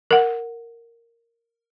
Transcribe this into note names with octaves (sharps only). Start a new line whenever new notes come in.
A#4 F#5